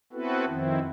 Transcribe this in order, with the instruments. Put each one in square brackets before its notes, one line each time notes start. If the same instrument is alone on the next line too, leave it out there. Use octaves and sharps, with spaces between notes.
[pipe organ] B3 C4 E4 F#4 A4 B4
F2 D#3 C4 E4